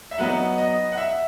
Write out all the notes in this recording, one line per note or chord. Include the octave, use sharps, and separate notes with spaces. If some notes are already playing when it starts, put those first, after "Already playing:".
E5
F#3 B3 D#4 F#5
D#5
F#5
E5